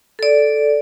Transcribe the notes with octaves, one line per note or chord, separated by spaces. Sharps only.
A4 D5